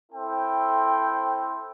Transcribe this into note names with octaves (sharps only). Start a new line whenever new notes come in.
C4 E4 A4 C5 G5